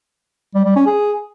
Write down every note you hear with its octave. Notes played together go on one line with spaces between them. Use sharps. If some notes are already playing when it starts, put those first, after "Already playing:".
G3
G3
C#4
G#4